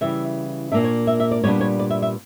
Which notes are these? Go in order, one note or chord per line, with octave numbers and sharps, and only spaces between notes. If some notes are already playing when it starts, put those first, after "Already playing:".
C#3 E3 G3 E5
A#2 A#3 D4 E5
C#5
E5
E5
D5
A#2 G3 B3 D4 C#5
C#5
D5
E5
E5